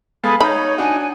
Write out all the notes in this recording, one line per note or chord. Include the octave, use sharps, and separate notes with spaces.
G#3 B3 A4 F5 G#5 B5 D#6
D#4 C#5 F5 A#5 B5 G6
D4 F#4 G#5